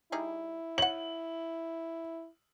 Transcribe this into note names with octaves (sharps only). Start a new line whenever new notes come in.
G3 D#4 E4 G#4
C#5 F#5 F#7